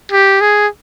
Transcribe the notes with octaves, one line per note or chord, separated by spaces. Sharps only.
G4
G#4